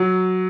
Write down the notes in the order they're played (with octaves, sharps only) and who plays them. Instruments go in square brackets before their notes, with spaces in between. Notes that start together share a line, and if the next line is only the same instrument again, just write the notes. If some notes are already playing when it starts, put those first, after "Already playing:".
Already playing: [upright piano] F#3